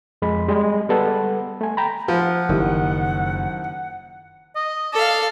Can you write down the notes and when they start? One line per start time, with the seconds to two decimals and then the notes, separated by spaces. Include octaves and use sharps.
0.22 F2 G#3 B5
0.48 G3 G#3
0.89 G3 B3 A4 B4 F#5
1.61 A3 G#5
1.77 G5 A#5 B5
2.08 F3 F#5
2.49 F#1 D#3 E4 G4
4.56 D#5
4.93 A4 D5 F5